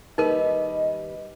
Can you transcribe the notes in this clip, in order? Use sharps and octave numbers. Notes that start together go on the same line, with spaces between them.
D#2 G3 D#4 A#4 B4 D#5